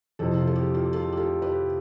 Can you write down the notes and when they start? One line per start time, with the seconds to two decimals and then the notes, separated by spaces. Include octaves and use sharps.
0.19 F2 C3 E3 A4 C5
0.38 F4
0.47 A4
0.55 G4
0.74 F4 A4
0.85 G4
0.93 F4 A4
1.12 G4
1.17 F4 A4
1.42 G4 B4